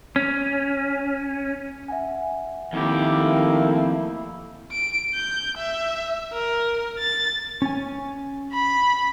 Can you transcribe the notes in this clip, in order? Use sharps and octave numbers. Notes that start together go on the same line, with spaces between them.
C#4
E5 F#5 G#5
F2 D#3 A3 A#3 E4 G4
D7
G6
E5
A#4
A6
C#4 G#5
B5